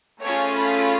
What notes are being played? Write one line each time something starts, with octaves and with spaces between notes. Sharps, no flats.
A3 C#4 F4 G#4 C#5
B5